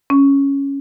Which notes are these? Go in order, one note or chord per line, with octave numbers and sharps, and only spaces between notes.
C#4